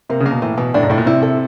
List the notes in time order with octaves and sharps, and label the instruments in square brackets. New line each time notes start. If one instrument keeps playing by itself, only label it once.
[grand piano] C3 [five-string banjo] A#3
[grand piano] C#3
[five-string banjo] A#3
[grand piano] B2
[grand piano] A2 [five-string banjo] E3
[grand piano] B2 [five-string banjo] E3
[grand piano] A2 [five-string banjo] D4
[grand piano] G#2
[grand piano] A2 [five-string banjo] D4
[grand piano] A#2
[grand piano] C3 [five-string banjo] E4
[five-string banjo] A4